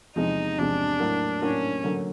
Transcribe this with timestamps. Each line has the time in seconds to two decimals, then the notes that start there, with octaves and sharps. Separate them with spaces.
0.16 E2 C3 F3 G#3 D#4
0.58 E2 C3 F3 G#3 D4
1.00 A2 F#3 A#3
1.41 A2 F#3 A#3 C#4
1.84 D3 F#3 A#3